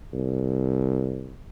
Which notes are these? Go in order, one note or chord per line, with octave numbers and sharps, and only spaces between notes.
C2